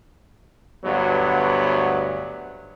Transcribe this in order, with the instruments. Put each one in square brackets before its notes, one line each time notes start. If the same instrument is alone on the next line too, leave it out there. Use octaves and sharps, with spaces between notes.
[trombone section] D2 G2 F#3 B3